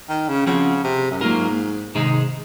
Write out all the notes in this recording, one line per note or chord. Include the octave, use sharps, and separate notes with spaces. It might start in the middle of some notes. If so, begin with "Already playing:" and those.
D#3
C#3
C#3 F3 C4 F#4
C3
F#2
G#2 F#3 A#3 F4 A#4
G#2 C3 D#3 G#3 D#4 G#4